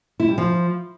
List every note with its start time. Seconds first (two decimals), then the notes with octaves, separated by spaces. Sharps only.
0.20 E4
0.29 G3
0.38 F3